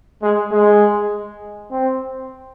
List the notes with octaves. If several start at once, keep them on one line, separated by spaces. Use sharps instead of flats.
G#3
G#3
C4